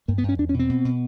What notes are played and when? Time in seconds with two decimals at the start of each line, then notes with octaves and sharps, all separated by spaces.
0.08 G2 A#3
0.18 B3
0.23 G2
0.29 C#4
0.39 E2 D4
0.49 C#4
0.54 B2
0.59 C4
0.69 B2
0.85 B2